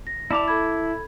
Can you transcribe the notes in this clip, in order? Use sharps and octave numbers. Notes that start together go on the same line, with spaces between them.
A#6
E4 D5 A5 D6 F7
A4 B5 G#6